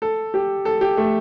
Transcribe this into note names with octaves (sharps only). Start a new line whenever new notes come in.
A4
G4
A4
G4
A3